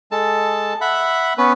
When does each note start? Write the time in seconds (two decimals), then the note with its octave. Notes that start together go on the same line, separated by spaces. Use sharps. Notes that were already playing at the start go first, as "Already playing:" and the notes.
0.12 G#3 A4 A5
0.81 E5 F#5 B5
1.38 B3 C#4 B4